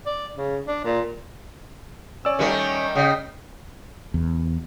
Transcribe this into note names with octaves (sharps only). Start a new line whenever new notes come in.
D5
C#3
D4
A#2
C#4 D5 E6
D#3 G3 A3
C#3 D#5 G5
E2